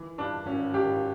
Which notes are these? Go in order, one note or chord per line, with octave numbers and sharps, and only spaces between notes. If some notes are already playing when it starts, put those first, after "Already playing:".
Already playing: E3
G2 D4
G#1 C#4
G#1 G4